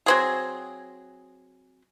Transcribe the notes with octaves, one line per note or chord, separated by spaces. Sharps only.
F#3 C4 G#4